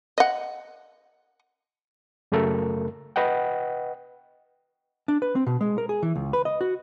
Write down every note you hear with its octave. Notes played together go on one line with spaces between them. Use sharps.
D#5 F#5
F#2 C#3 A3 A4 A#4
B4 D#5 F#5 G5
D4
B4
C4
B2
G#3
A#4
G#4
E3
C#2
B4
D#5
F#4